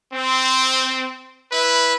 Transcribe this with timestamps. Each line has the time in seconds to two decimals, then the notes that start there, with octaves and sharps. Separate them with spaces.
0.12 C4
1.51 E4 B4